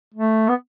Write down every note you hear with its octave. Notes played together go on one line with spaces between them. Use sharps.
A3
B3